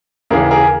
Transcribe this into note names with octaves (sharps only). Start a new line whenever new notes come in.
D#2 C#3 E3 G#4 A#4
G#4 A#4